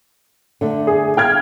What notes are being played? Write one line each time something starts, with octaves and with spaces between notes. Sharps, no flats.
D3 A3
G#4
F5 G5 F6 G#6